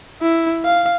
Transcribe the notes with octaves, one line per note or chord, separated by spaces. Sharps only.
E4
F5